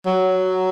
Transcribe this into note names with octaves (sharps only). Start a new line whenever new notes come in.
F#3